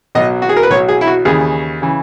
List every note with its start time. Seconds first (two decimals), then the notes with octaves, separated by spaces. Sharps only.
0.15 B1 B2 F#3 D#5
0.42 F#4
0.49 G#4
0.56 A#4
0.63 B4
0.70 B1 B2 F#3 C#5
0.88 G#4
1.01 E4
1.07 F#4
1.25 D#2 C#3 E3 G#4
1.82 C#3 E3